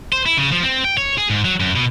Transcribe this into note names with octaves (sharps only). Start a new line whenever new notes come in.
C5
E4
C#3
F3
C4
G5
C#5
G#4
G#2
F#3
F#2
B2